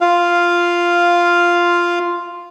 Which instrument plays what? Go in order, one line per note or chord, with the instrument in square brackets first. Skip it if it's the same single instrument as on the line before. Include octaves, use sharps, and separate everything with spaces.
[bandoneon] F4 F5